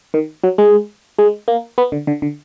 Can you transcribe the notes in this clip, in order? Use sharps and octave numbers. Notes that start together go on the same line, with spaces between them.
D#3
F#3
G#3
G#3
A#3
B3
D3
D3
D3